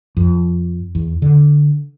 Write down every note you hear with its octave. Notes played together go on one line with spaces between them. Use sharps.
F2
E2
D3